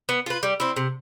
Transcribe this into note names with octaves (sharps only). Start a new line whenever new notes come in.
B3
F4 B4
G3
C4 E4
C3